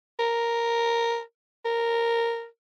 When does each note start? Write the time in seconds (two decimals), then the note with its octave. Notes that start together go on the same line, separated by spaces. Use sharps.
0.19 A#4
1.65 A#4